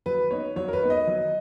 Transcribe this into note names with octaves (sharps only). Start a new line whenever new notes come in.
F#3 B4
B3 D#4 C#5
F#3 C#5
A#4
B4
B3 D#4
D#5
F#3